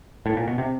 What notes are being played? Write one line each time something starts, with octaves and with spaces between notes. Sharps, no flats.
A2
A#2
B2
C3